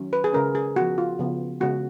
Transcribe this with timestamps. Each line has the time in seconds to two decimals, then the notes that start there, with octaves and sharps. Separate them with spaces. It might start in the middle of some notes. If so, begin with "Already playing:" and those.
Already playing: D#3 F#3 C#4
0.13 B4
0.24 G#4
0.33 C#3 G#3 C#4 A#4
0.55 G#4
0.76 F3 B3 F#4
0.98 F4
1.19 C#3 F3 B3
1.60 C#3 G#3 B3 F#4